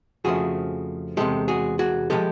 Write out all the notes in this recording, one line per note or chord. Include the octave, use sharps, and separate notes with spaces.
F2 C#3 F3 A3 F#4 G#4
E2 C3 F3 G#3 G4 A4
F#4 G#4
F#4 G#4
C3 F3 G#3 G4 A4